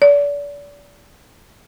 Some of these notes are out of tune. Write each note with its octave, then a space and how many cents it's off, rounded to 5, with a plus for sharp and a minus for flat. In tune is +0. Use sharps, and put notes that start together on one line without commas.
D5 -35